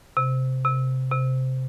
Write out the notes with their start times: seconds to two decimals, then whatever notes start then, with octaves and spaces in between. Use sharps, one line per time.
0.17 C3
0.65 C3
1.11 C3